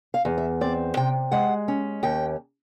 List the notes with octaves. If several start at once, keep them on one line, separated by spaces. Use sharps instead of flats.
F5
E2
E5
C4 D5
C3 G5
G#3 F#5
C#4
D#2 G5